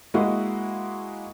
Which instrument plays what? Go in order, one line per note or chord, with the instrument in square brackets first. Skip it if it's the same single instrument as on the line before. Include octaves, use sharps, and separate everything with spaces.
[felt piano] G#3 A#3 E4 F#4 D#5